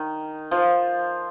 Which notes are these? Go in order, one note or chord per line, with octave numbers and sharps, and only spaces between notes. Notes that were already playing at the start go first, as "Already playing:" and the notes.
Already playing: D#3
F3